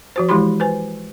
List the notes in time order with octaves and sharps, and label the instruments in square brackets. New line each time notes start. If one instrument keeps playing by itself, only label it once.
[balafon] F3 F#4 C5
E3 G#3 E4 G4 B5 C6
B4 C5 G#5